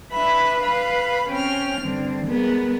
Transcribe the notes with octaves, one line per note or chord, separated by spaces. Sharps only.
D4 B4 E5 B5
B4 F5 B5
C4 C#4 G5 F6
G2 D3 C4
G3 G#3 B3 G#4 A#4